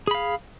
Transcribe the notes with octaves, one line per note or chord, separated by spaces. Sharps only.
G#4 F5 B5